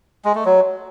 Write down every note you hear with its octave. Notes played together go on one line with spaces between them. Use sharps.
G#3
A3
F#3